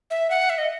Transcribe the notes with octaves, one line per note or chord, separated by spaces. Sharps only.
E5
F#5
E5
D#5